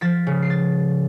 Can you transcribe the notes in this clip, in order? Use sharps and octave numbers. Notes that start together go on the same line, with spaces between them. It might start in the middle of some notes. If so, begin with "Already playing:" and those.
F3 A6 B6
C#3
C7
A6